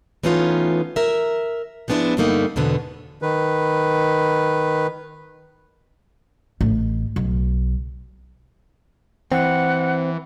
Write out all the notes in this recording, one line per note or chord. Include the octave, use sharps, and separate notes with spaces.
E3 A3 B3 C#4 D#4 F4
A#4 E5
F3 G#3 B3 D4 E4
G2 D3 G3 A3 A#3 D#4
E2 G#2 B2 D3 B3
D#3 B4
A1
B1
E3 C4 F#5